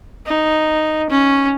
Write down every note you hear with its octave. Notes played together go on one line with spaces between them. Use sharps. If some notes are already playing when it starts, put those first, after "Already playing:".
D#4
C#4